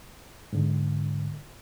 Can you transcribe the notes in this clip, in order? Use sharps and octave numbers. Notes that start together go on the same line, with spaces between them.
G#2 D3